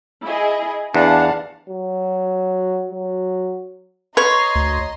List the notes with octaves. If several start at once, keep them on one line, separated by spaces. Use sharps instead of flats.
E4 G#4 D#5
E2 D4 F5 F#5 A5
F#3
F#3
B4 C#5 D#5 A#5 C6
D2